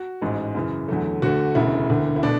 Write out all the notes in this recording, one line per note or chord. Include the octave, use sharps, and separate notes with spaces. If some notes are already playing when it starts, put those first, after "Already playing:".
Already playing: F#4
A1 G#2 G#3
F#2 C#3 E3
E2 D3 F#3 A3
D2 D3 A3 F#4
E1 D2 C#3 E4
E1 D2 D3
E4
B2 A3 D4